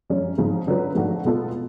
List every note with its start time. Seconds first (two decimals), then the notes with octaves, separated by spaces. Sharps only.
0.10 F#2 F3 G#3 C#4
0.38 G#2 F3 G#3
0.67 D3 F#3 C#4 F4 B4
0.95 G#2 F3 A3 D4 F#4
1.25 B2 G#3 B3 F4 A4